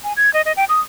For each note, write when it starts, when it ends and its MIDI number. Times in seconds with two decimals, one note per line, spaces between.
0.04 0.13 80
0.17 0.32 92
0.34 0.41 75
0.45 0.52 75
0.56 0.64 79
0.69 0.80 87